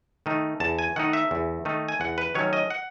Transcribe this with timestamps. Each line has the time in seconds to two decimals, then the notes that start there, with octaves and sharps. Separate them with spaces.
0.26 D#3 A3 D#4
0.60 E2 A5
0.79 G#5
0.96 D#3 A3 D#4 F#5
1.13 E5
1.31 E2
1.65 D#3 A3 D#4
1.88 G#5
2.00 E2 F#5
2.18 B4
2.35 D#3 F#3 A3 C#4 C#5
2.53 D#5
2.70 F#5